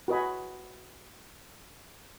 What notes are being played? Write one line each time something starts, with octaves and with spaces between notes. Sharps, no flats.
F#4 B4 D#5 G#5 B5